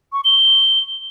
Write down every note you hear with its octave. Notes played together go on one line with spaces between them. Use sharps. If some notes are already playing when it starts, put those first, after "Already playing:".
C#6
G7